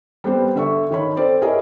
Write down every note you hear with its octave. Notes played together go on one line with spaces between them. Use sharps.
G3 B3 C4 G4 C5
D3 E5 C#6
D#3 C#5 B5
C4 A4 C5 D5
E4 G#4 A#4 C#5 D#5 A#5